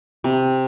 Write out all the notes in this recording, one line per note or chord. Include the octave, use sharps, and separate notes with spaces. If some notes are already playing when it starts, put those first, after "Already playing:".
C3